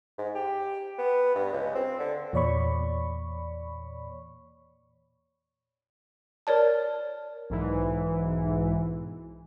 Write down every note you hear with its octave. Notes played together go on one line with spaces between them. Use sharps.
G#2
G4
B3
G2
C#2
C4
D3
E2 A#2 C#5 D5 B5 C#6
A#4 C#5 D5 A5
B1 G#2 E3